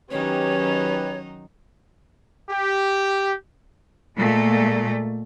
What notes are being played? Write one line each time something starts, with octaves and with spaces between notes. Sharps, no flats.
D#3 F#3 C#4 D#4 G4 B4 C#5
G4
A#2 G#3 A3